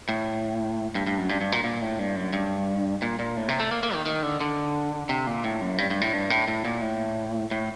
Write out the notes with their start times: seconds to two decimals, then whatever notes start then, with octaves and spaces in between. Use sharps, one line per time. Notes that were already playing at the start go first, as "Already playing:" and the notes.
0.09 A2
0.95 G2
1.07 G2
1.18 F#2
1.29 G2
1.41 G2
1.52 A#2
1.64 A#2
1.81 A2
1.99 G2
2.16 F#2
2.33 G2
3.02 A#2
3.19 A#2
3.37 A2
3.48 C3
3.60 A3
3.71 A#3
3.83 A#3
3.94 D#3
4.06 D#3
4.23 D3
4.41 D3
5.09 C3
5.27 A#2
5.44 A2
5.61 F#2
5.78 G2
5.90 G2
6.01 A2
6.13 G2
6.30 A2
6.48 A2
6.65 A#2
6.82 A2
7.51 A2